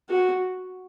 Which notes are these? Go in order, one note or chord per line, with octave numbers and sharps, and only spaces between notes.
F#4